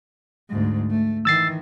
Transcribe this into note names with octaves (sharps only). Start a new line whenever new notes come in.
D2 G#2
A3
D#3 E3 E6 A6 C7